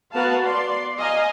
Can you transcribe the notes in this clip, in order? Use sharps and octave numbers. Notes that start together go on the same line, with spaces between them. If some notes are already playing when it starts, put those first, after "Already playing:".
B3 F#4 A#4 B4 F5 A5
D5 C6
D#5 F5 G#5 A#5